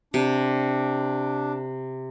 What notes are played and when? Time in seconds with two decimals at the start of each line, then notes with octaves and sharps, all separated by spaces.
0.14 C3 D4